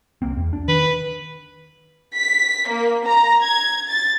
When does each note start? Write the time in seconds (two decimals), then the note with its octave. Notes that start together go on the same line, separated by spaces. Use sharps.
0.22 C2 A#3 C4
0.37 E2
0.53 D4
0.68 D#3 B4
2.15 B6
2.68 A#3
3.04 A#5
3.40 G#6
3.87 A6